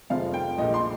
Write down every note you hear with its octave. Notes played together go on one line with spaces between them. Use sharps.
F1 F2 C3 F3 G#3 F5
G5
A#1 A#2 G#3 D#5
C6